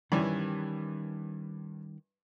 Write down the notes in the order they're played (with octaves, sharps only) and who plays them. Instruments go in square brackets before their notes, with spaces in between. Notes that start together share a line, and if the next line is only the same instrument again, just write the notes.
[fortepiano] G2 E3 [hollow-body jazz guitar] D#3 G3 C#4